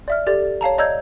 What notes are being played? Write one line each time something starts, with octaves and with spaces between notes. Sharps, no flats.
D5 E5 F6
G4 A4 D5 A6
C#5 F5 A5 A#5
D5 D#5 A#5 E6 G6 G#6